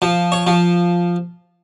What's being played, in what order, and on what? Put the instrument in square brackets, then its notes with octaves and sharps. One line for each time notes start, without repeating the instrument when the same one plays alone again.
[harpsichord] F3
C#5
F3